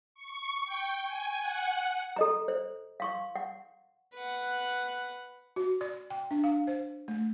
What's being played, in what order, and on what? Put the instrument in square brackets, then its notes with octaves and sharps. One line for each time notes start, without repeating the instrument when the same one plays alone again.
[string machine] C#6
G5
G#5
F#5
[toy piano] A4 D#5 A#5
C5
F5 C6 C#6
F#5
[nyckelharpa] B4 F#5
[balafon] F#4
D5
G5
D4
F5
C5
A3